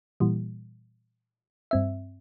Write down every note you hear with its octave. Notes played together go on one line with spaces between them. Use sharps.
A#2 E3 G3
G2 C4 E5